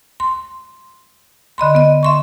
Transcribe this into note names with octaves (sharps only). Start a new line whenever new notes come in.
C6
D3 D#5 B5 C6
B3 D#5
E5 C6 C#6